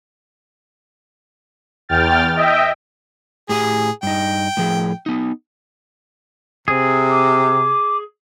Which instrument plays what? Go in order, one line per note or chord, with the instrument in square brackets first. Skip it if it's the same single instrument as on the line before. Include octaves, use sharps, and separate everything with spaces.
[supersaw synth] E2 G5 F6 A6
D#5 E5 G5
[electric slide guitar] A2 G4 G#5 [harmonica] G#4
[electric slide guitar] G2 D#4 [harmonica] G5
[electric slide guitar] A2 F3 G#4
B3 D#4
[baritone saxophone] C3 [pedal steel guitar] G#4
[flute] D6